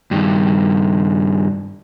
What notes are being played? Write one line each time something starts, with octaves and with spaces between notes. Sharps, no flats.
G2 D#3